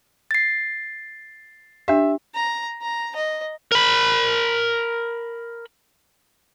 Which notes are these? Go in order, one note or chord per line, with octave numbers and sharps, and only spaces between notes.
A6 C7
D4 G4 E5
A#5
A#5
D#5
A#4 B5